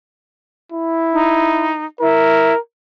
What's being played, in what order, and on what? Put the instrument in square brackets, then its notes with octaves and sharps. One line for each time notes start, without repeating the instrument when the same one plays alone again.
[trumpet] E4
[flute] D#4
[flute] E4 [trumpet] A#4